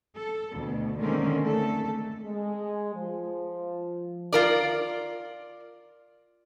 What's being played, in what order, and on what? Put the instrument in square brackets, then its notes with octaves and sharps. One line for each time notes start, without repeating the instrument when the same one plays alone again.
[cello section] A4
D2 B2
D3 D#3 G#3 A#3 C4 C#4
A3 A4
[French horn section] G#3
F3
[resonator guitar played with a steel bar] F4 A#4 D5